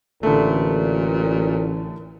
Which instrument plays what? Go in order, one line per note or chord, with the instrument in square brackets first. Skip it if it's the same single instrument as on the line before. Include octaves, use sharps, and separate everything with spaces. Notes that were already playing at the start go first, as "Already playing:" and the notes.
[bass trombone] A1 [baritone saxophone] A#2 [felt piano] D3 A3